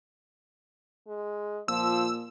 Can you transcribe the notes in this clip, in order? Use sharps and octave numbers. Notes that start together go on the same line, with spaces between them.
G#3
A#2 F3 E6